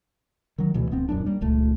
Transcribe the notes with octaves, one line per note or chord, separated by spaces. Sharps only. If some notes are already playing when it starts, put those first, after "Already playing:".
D#3 F#3
D2 B2 E3
D1 B3 C4
D#1 F#2 D4
G3 A#3
D#1 C#2 A3